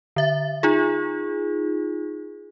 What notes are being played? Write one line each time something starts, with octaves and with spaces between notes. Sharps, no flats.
D3 E5 A6
D#4 F4 G#4